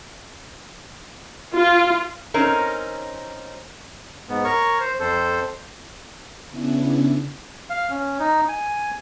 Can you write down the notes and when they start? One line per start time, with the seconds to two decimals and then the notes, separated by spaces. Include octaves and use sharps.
1.54 F4
2.34 C4 C#4 D#4 A#4
4.29 G#2 B3
4.44 A#4 C#5 C#6
4.80 C5
5.00 F2 A4 C5
6.50 C#3 B3 C#4 D4 E4
7.70 F5
7.90 C#4
8.20 D#4
8.49 G#5